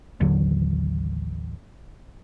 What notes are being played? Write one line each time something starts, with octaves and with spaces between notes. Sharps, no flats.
A1 D#2 D3 F#3